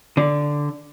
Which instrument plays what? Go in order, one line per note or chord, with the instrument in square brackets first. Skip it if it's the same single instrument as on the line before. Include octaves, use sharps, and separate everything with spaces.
[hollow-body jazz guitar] D3